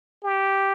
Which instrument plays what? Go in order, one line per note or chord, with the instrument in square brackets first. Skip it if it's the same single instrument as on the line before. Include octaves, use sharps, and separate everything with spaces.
[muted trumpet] G4